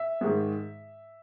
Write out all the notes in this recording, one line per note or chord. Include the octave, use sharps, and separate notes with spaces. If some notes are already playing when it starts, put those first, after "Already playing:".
Already playing: E5
G#2 D#3 G#3